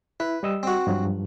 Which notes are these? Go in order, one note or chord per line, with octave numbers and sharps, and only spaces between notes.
E4 B4
G3 D#5 E6
C4 F#4
G2 F3 F#3